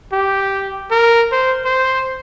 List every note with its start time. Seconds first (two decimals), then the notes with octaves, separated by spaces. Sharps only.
0.13 G4
0.91 A#4
1.32 C5
1.65 C5